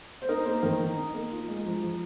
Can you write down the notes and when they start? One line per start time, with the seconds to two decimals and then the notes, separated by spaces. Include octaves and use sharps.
0.22 C5
0.29 D#4 A#4
0.46 A#3 C5
0.63 D#3 A#4
0.79 D#3
0.97 D#4
1.14 A#3
1.31 F4
1.48 G#3
1.65 F3
1.81 F3